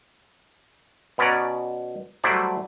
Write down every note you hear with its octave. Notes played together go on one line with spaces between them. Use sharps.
B2 B3 C#4 D5 A#5
F#3 G3 A3 E4 C5 D5